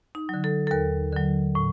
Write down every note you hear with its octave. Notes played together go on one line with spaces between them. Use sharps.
D#4
D3 F#3
A4
A4
D#2 A#4
D3 F#3
A2